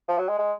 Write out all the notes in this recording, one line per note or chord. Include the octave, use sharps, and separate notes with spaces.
F3
F#3
G#3
G#3